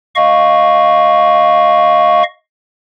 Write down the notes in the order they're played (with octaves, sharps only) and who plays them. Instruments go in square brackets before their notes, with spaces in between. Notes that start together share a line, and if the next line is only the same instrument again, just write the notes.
[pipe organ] D#5 F5 C#6